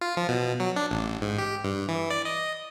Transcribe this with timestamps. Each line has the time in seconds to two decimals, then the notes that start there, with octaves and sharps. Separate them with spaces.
0.01 F4
0.17 F3
0.29 B2
0.60 F#3
0.76 D4
0.91 A1
1.22 G#2
1.38 G4
1.64 G2
1.89 E3
2.10 D5
2.25 D#5